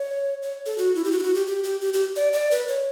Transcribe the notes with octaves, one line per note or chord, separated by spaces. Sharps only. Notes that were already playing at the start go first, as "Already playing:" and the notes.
Already playing: C#5
C#5
A4
F#4
E4
G4
F#4
E4
F#4
G4
G4
G4
G4
G4
D5
D5
B4
C#5